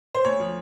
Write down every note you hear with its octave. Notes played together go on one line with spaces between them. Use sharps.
C5
D2 C#5
F3